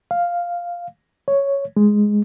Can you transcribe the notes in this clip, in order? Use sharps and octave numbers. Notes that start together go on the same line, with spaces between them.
F5
C#5
G#3